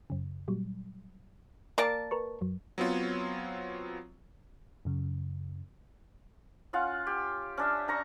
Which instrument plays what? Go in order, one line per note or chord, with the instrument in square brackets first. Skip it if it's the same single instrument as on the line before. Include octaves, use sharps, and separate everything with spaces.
[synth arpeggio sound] F#2 C#3
A#2 F#3 G3
[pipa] A#3 D5 A5
[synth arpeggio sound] A#4 B4 C#6
F#2 F#3
[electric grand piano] F#3 B3 C4 F4 C#5
[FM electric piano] F#2 C#3
[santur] C#4 F4 F5 F#5
G4
C#4 D4 E5
D4 A#5 C#6